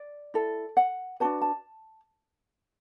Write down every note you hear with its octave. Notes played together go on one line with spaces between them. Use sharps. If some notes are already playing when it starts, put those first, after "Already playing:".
Already playing: D5
E4 A4
F#5
D4 F#4 B4 A5
A5